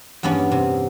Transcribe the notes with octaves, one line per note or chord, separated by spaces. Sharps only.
E2 G2 A#3 B3 C#4
C3